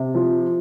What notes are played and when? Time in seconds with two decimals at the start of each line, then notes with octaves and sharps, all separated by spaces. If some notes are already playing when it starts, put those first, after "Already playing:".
Already playing: C3
0.14 F3